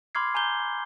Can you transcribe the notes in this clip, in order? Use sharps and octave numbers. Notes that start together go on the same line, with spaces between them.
B5 C6 D6 F6 G#6 C7
G#5 A#5 G6 G7